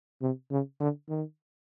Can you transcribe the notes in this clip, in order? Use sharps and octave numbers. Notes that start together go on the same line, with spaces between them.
C3
C#3
D3
D#3